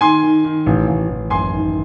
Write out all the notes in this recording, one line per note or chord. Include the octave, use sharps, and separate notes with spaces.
D#3 G#5 C6
D#3
D#3
A1
A1
A1
F#1 G#5 C6
D#3